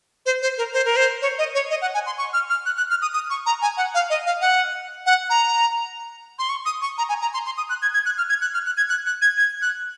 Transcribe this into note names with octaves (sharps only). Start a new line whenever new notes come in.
C5
C5
A#4
C5
A#4
C5
C#5
D#5
C#5
D#5
F#5
G#5
C6
C#6
F6
F6
F#6
F#6
F6
D#6
D#6
C#6
A#5
G#5
F#5
F5
D#5
F5
F#5
F#5
A#5
C6
C#6
D#6
C#6
A#5
G#5
A#5
C6
C6
D#6
F#6
G#6
G#6
F#6
F6
G#6
F#6
F6
F#6
G#6
F#6
F#6
G#6
G#6
F#6